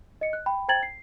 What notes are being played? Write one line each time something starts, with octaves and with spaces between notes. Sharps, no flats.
D#5 C#7
F#6
G5 B5
C5 G5 A#5 G#6 A6 F#7
C7